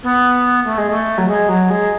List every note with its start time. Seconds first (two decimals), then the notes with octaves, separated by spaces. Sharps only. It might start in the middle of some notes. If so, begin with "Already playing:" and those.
0.03 B3
0.65 A3
0.77 G#3
0.89 A3
1.18 F#3
1.27 G#3
1.48 F#3
1.70 G#3